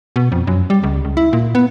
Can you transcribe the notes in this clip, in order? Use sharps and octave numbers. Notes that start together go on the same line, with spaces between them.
B2
F2
F#2
G3
C#2
C#2
E4
A#2
B3